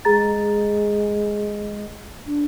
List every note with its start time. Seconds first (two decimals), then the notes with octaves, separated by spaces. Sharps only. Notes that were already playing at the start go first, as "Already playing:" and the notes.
0.05 G#3 G#4 A#5 A6
2.27 D4